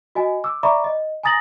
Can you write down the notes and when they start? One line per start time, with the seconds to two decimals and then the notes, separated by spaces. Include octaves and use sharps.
0.15 F#4 D#5 G#5
0.44 D6 E6
0.63 D5 E5 A#5 B5 C#6 D6
0.84 D#5
1.23 G#5 A#5 D#6 A6 A#6 F#7